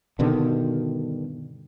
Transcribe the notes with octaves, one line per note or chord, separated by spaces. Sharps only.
G2 B2 D3 D#3